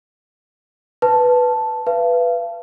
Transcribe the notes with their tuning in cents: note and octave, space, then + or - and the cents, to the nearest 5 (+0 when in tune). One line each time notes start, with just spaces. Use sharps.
B4 +0 A5 +0
B4 +0 F5 -40